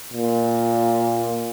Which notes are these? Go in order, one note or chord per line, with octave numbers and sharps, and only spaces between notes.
A#2